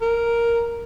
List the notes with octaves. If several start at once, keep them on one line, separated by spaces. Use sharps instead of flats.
A#4